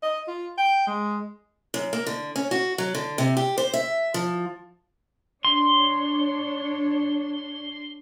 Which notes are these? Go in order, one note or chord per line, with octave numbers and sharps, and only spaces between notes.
D#5
F4
G5
G#3
F#2
A#3
D3
C#4
F#4
F#3
D3
C3
G4
C5
E5
F3
D4 C#5 C6